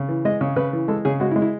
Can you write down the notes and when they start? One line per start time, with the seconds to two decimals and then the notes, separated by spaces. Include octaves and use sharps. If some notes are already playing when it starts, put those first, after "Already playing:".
Already playing: C#3
0.09 E3
0.25 G#3 D#5
0.41 C#3
0.56 C#3 B4
0.73 E3
0.88 G#3 A4
1.05 C#3 G#4
1.20 G#3 F#4
1.31 E4
1.36 G#3
1.42 E4